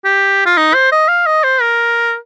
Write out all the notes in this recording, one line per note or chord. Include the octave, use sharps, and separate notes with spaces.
G4
F4
D#4
C5
D#5
F5
D#5
C5
A#4